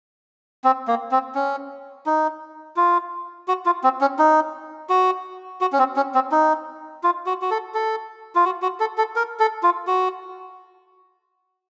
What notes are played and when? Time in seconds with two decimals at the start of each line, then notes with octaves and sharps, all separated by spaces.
0.64 C4
0.88 A#3
1.11 C4
1.35 C#4
2.06 D#4
2.76 F4
3.48 F#4
3.66 F4
3.84 C4
4.01 C#4
4.19 D#4
4.89 F#4
5.61 F#4
5.73 C#4
5.79 C4
5.96 C#4
6.15 C4
6.32 D#4
7.03 F4
7.26 F#4
7.42 F#4
7.51 A4
7.74 A4
8.35 F4
8.45 F#4
8.62 F#4
8.80 A4
8.98 A4
9.16 A#4
9.39 A4
9.63 F4
9.87 F#4